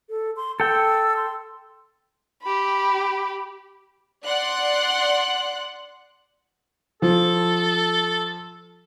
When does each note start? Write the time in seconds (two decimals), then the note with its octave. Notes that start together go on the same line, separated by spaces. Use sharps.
0.09 A4
0.37 C6
0.60 A4 G5 E6
1.17 C6
2.43 G4 B5
4.25 D5 F#5 C6 F#6
7.02 F3 A4